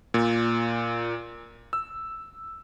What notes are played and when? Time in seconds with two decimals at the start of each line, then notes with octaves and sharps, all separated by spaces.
0.14 A#2
1.73 E6